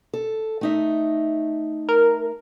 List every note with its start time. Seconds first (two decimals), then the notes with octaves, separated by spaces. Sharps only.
0.13 A4
0.61 A3 D#4 E5
1.89 A#4